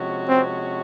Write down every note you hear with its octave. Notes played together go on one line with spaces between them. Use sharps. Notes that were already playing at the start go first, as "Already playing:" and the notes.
Already playing: C3 F3 G#3 C#4 F#4
C4